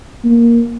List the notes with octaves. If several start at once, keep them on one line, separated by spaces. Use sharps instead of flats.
A#3